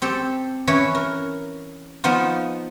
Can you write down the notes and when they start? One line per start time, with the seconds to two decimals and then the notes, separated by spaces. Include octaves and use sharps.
0.02 C4 G4 A4
0.67 E3 C#4 E4 B4 C#5
0.95 A#4
2.04 F3 B3 D#4 F4